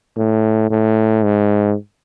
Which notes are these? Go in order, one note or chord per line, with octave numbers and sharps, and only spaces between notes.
A2
A2
G#2